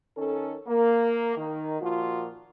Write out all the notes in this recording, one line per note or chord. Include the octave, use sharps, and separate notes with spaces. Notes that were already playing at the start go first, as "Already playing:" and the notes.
D#3 C#4 A4
A#3
D#3
A#2 F3 F4 F#4